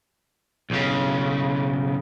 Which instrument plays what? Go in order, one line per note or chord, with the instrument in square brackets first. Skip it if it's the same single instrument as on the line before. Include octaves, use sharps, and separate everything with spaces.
[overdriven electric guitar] B1 C#3